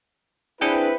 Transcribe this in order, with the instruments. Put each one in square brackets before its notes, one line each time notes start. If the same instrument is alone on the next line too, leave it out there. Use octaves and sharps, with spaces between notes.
[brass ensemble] C4 E4 B4 [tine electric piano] D4 G#4 G5